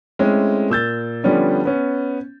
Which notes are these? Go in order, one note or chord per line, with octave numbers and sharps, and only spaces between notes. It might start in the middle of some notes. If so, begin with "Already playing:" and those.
G#3 A3 C4 C#4 E4
A#2 E6 G6 A6
D3 F3 G3 B3 C#4 D4
B3 C#4